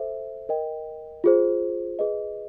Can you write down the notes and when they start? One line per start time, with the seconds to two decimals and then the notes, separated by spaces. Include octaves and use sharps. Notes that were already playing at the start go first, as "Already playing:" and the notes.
Already playing: A4 C5 E5
0.49 A#4 D#5 G5
1.24 F4 G#4 C5
1.99 G#4 B4 D#5